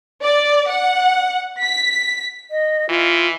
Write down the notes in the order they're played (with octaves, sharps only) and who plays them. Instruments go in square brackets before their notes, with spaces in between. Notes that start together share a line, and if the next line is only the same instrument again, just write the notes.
[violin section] D5
F#5
B6
[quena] D#5
[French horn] E3 [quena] F4